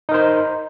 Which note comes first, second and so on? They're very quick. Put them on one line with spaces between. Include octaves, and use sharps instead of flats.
D#4 A#4 C5